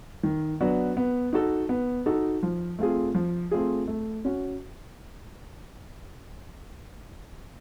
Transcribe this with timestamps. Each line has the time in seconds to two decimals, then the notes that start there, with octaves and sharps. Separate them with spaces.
0.23 D#3
0.61 F#3 B3 D4 F#4
0.97 B3
1.33 D#4 F#4 A4
1.69 B3
2.06 D#4 F#4 A4
2.43 F3
2.79 A3 C4 F4 G#4
3.15 F3
3.51 A3 C4 F4 G#4
3.88 A3
4.25 C#4 F#4